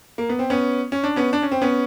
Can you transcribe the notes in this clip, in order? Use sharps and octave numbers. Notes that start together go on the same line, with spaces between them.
A#3
B3
C4
B3 C#4
C#4
D4
B3 C#4
D4
C#4
C4
B3 C#4